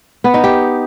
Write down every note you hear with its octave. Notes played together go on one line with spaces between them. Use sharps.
B3
D#4
G4